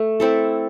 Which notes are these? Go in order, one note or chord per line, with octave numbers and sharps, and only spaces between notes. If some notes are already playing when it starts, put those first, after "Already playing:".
Already playing: A3
C4 E4 A4